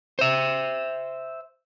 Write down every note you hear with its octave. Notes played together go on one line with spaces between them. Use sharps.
C5 E5